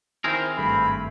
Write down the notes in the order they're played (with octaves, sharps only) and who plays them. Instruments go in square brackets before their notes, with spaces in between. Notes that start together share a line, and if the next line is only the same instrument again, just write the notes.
[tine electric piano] D#3 E4 C5 [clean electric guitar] C4 G#4 A#4
[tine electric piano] G#1 G2 A3 [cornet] B5